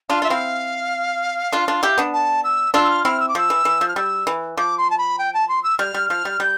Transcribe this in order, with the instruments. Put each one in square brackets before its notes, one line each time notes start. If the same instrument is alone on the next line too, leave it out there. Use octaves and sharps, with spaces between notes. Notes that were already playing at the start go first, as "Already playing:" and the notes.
[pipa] D4 F4 [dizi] F5
[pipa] F4 [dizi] E5
[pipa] C4 E4 [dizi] F5
[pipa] D4 F4
D4 F4
E4 G4
B3 D4
[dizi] A5
E6
[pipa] D4 F4 [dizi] E6
[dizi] E6
F6
[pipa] C4 E4 [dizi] F6
[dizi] E6
D6
[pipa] F3 [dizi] E6
[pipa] E3
E3
F3
[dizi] F6
[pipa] G3 [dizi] E6
[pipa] E3
[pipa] F3 [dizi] D6
[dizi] C6
A5
B5
G5
A5
C6
E6
[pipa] G3 [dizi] F6
[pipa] G3
[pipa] F3 [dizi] F6
[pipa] G3
[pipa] G3 [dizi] G6